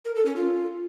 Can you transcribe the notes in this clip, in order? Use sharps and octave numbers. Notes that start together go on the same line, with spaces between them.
A#4
A4
C#4
F4